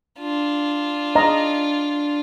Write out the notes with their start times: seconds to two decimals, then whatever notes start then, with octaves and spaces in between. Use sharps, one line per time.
0.20 D4 F4
1.15 D#5 A#5